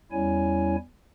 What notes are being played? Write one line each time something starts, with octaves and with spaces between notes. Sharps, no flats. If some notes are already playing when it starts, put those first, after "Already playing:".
E2 G3 C#4 E4 C#5 G#5